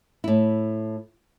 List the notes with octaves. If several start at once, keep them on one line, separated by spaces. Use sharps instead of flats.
A2 E4